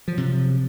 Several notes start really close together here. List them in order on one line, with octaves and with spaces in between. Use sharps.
F3 F#3 C3